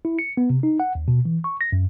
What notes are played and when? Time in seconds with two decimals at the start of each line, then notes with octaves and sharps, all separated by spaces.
0.05 E4
0.19 C#7
0.37 B3
0.50 C3
0.63 D#4
0.80 F#5
0.95 D#2
1.08 B2
1.25 E3
1.44 C#6
1.61 A#6
1.72 F#2